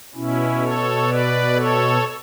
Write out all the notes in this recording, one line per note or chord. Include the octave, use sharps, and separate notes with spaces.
B2 C#4 E4
A4 C#5
B4 D5
A4 C#5